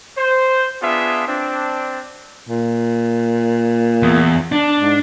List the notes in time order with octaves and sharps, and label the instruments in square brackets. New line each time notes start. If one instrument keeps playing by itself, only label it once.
[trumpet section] C5
B3 D4 F4 G#4 E5
C4 D4
[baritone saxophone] A#2
[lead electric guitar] E2
D4
[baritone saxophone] G#2